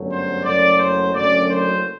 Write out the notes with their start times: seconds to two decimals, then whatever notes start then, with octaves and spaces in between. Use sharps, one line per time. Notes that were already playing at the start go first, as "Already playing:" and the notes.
Already playing: G1 F#2 F#3 A3
0.10 C5
0.43 F#1 F#2 F#3 A3 D5
0.78 C5
1.13 F#1 F#2 D3 A3 D5
1.47 C5